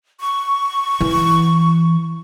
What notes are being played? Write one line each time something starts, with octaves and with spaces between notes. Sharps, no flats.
C#6
E3